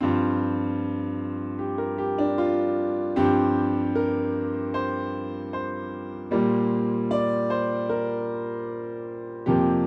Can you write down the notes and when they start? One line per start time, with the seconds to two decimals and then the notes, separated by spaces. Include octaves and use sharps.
0.01 G2 F3 C4 F4
1.59 G4
1.78 A#4
1.98 G4
2.18 D4
2.38 F4
3.16 G2 F3 C4 G4
3.95 A#4
4.74 C5
5.53 C5
6.31 A#2 G3 A#3
7.11 D5
7.50 C5
7.89 A#4
9.46 F2 C3 F3 A#3 G4